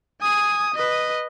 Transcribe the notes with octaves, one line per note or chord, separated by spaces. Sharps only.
G#5 D#6
B4 D#5